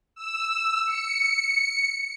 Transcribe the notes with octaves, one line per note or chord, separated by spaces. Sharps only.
E6
C#7